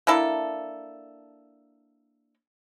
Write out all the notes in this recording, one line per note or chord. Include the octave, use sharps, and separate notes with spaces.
A#3 D4 E4 A4